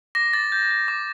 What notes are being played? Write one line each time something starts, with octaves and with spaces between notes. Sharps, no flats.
D6 A#6
D6 A6
G6
G6
D6